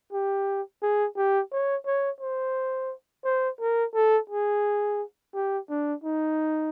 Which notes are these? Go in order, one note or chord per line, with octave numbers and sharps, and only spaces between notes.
G4
G#4
G4
C#5
C#5
C5
C5
A#4
A4
G#4
G4
D4
D#4